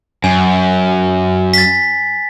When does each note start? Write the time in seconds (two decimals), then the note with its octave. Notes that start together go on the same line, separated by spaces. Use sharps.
0.24 F#2 G#5
1.54 A6 B6